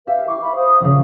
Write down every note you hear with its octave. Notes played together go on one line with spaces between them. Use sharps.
G4 B4 E5 F5
E4 C#6 D6 C7
E5 F5 B5
C5 F5 D#6
A#1 C#3 F5